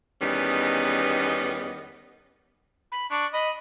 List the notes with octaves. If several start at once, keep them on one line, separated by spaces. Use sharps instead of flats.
E2 D#3 G3 B3 C#4 D#5
B5
D4 C#6
D#5 B5